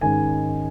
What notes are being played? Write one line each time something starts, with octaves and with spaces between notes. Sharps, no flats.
G#2 D#3 G#3 C#4 G#5